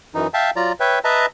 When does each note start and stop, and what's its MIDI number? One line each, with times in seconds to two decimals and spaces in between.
0.14 0.27 42
0.14 0.27 52
0.14 0.27 63
0.34 0.50 76
0.34 0.50 77
0.34 0.50 79
0.34 0.50 81
0.56 0.72 54
0.56 0.72 65
0.56 0.72 74
0.56 0.72 82
0.80 0.99 71
0.80 0.99 73
0.80 0.99 76
0.80 0.99 79
1.04 1.26 71
1.04 1.26 75
1.04 1.26 76
1.04 1.26 81
1.04 1.26 82